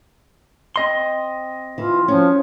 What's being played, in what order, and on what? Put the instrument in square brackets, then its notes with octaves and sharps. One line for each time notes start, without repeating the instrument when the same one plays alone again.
[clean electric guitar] C4 D#5 C6
[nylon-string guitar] E3 [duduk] F4
[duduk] F3 [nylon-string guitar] C#4